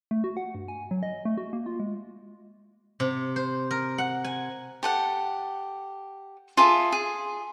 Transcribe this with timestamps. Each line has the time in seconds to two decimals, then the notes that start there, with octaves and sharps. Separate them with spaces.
0.11 A3
0.24 F#4
0.37 F#5
0.55 G2
0.68 G#5
0.91 F#3
1.03 D#5
1.25 A3
1.38 F#4
1.53 A#3
1.66 F4
1.80 G#3
3.00 C3
3.36 C5
3.71 A#4
3.98 F#5
4.24 G#5
4.83 G4 A4 F#5
6.57 F4 G#4 A4 E5
6.92 G#4